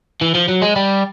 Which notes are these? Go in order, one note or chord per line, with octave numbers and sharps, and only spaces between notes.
E3
F3
F#3
G#3
G3